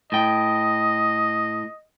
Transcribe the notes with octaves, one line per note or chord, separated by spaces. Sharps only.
A2 D#5 G5